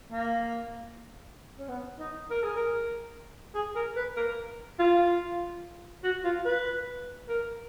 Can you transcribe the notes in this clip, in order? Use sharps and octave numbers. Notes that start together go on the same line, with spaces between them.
A#3
C#4
B3
D#4
A#4
G#4
A#4
G#4
A#4
B4
A#4
F4
F#4
F4
B4
A#4